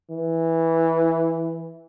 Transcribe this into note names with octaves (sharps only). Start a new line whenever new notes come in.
E3